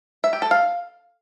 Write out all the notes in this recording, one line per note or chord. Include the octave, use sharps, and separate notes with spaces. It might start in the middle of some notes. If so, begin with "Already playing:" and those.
E5
G4
A4
F5